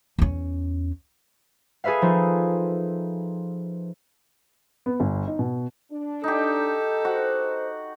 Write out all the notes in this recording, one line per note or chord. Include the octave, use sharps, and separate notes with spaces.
E2 C#4
G#4 A4 B4 E5 F5
F3 D#4
B3
G1
D#4
B2
D4
D#4 G4 A4
F#4 C5